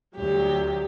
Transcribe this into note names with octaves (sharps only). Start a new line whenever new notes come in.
D2 F#3 G4